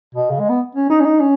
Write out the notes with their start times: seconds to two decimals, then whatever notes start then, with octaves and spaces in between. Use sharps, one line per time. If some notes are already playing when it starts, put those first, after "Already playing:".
0.15 B2
0.30 C#3
0.40 G#3
0.50 B3
0.75 C#4
0.90 D#4
1.00 C#4
1.05 D#4
1.20 C#4